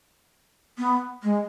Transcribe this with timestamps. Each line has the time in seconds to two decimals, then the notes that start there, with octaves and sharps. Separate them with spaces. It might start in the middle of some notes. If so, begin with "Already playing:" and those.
0.78 B3
1.23 G#3